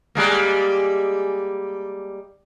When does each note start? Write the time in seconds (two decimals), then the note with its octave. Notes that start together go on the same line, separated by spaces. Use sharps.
0.15 G3 G#3 A#3